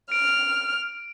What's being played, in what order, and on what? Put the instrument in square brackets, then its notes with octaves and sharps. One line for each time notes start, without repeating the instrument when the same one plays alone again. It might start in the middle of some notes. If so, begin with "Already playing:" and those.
[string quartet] F6 [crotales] D7